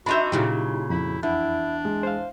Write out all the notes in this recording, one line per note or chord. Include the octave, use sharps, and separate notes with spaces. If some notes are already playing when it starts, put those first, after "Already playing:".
D4 D#4 F#4 E5 B5 C6 G6
A#2 C#3 F#3 D#4 E4 G4
F2 E4 B5
E2 D4 E4
G#3
C5 F5